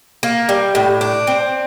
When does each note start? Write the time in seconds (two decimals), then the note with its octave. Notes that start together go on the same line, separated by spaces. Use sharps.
0.23 A#3
0.49 G3
0.75 A2
1.01 D4
1.27 C4